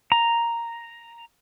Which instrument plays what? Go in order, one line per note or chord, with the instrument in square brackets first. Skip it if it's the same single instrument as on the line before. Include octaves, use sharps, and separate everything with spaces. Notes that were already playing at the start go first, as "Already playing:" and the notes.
[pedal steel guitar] A#5